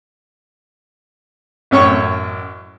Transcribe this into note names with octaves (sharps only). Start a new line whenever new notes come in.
A1 F#2 C#5 C#6